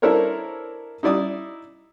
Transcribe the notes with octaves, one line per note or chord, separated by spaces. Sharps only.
D4 E4 A4 A#4 C5 C#5
D#4 E4 D5 D#6